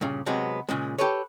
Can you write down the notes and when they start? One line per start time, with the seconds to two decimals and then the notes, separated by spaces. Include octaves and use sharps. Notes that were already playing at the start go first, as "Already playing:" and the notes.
0.01 G2 A#2 C#3
0.26 C3 F#3 G#3 B3
0.69 A#2 C#3 G#3
0.98 G4 A4 B4 C#5